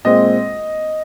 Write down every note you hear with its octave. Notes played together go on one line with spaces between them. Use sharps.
A#2 G#3 C4 D#5